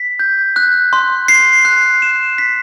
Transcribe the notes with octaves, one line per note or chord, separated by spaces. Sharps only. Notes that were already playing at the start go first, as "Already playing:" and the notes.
Already playing: B6
G6
F#6
C6
C7
F#6
E7
B6